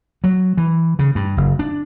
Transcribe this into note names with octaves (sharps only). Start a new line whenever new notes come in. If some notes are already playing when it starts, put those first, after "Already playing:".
F#3
E3
C#3
G2
F#1
D4